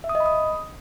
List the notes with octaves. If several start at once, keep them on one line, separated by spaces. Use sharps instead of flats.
E5
D#6
D#5
B5
D#6